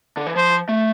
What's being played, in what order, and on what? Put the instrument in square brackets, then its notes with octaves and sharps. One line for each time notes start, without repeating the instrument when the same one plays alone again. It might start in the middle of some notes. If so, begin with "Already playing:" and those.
[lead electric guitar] D3
E3
[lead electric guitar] F3 [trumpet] C5
[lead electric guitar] A3